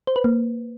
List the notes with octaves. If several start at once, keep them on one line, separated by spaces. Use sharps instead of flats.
C5
B4
A#3